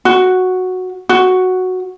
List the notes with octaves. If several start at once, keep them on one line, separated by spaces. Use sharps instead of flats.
F#4
F#4